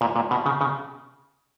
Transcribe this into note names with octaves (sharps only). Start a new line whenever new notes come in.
A#2
A#2
B2
C#3
C#3